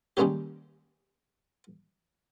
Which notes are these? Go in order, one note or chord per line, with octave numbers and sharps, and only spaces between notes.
D#3 G3 G#3 A#3 C#4 G4